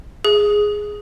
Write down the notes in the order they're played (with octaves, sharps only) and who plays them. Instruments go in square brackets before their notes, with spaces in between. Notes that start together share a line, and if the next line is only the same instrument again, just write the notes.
[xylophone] G#4